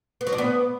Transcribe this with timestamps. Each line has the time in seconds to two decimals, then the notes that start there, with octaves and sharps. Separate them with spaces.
0.21 B3
0.27 F#3
0.32 D4
0.38 B3